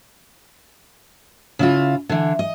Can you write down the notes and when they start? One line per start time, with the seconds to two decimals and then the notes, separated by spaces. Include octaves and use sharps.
1.59 C#3 E4 F4
2.09 D3 E3
2.39 D#5